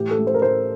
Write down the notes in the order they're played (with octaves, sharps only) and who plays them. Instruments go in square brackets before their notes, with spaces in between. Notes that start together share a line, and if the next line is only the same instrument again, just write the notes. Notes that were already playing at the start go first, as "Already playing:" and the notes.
Already playing: [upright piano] A2 E3 G4
A4
A3
C5
A#4
A2 C5